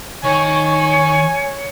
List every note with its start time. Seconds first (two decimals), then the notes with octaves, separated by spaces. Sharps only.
0.23 D#3 C#5 G5 G#5 C#6